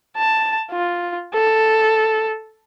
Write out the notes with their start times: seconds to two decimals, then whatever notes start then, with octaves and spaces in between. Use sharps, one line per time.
0.17 A5
0.71 F4
1.34 A4